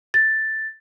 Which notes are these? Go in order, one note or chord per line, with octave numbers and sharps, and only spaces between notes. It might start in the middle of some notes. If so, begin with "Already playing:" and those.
A6